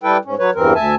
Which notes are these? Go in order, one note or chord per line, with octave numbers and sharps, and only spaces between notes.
G3 E4 A4 B4 G5
G#2 C#4
F#3 B4 C#5
E2 G2 E3 C4 A#4
D2 E5 G#5 A5